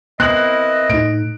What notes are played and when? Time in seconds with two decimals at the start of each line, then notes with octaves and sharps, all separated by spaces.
0.20 B3 C4 E4 A#4 D#5 F#6 F#7
0.90 A2 D#4 D7